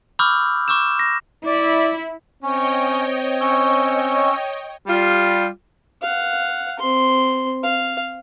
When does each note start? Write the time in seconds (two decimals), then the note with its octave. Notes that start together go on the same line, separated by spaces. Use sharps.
0.19 B5 C#6 D6 E6 F6 G6
0.68 C#6 D6 E6 G6 E7
0.99 A#6
1.46 E4 D5
2.43 C4 C#4 C#5 D#5 G5
3.41 C#4 C#6 E6
4.87 G3 F4
6.02 F5 F#5
6.79 C4 C6
7.63 F5